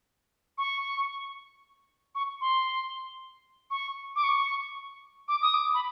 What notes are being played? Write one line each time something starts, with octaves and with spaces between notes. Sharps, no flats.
C#6
C#6
C6
C#6
D6
C#6
D6
D#6
D6
B5